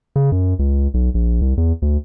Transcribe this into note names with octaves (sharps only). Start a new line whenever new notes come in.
C#3
F#2
C#2
B1
A#1
C2
E2
D2